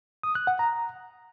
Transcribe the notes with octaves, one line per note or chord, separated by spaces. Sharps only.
D#6
F#6
F#5
A#5